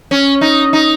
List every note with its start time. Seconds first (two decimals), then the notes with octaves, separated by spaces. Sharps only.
0.11 C#4
0.41 D#4
0.73 D#4